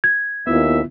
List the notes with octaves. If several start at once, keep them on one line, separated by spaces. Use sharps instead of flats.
G#6
D#2 B3 E4 F4 E5